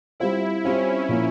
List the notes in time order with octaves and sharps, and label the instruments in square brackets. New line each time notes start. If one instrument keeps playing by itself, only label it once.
[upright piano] G3 C4 F4 C5 F5 [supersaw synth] E4
[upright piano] G3 C4 F4 C5 F5 [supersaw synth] C#4
[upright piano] A#2 F3 A#3